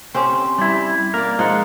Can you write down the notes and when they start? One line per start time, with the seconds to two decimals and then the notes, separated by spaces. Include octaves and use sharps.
0.14 C4 C#4 G4
0.58 G3 E4
1.14 A#3 A#4 D5
1.39 F3 G#3 D#4 F#5